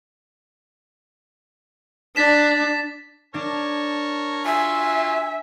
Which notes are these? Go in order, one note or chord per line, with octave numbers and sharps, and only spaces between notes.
D4 A6 B6 E7
D4 A#4 C#5 A5
F#3 F4 E5 G#5